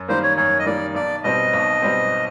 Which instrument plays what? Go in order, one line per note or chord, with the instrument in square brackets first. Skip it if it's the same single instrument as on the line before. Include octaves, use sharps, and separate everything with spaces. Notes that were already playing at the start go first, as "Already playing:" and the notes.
Already playing: [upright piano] F#2
[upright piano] D#3 G3 A#3 [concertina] C5
[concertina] C#5
[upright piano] F#2 [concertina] C#5
[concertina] D#5
[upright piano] D#3 G3 A#3 [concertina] D5
[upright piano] B1 [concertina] D5
[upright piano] B2 G3 C4 [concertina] D#5
[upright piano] B1
B2 G3 C4